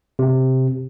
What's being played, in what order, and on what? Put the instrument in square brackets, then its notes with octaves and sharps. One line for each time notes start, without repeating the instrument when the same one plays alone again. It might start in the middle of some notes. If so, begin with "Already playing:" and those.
[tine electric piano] C3